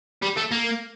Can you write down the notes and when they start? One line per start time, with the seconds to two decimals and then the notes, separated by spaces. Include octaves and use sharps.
0.22 G3
0.37 A3
0.51 A#3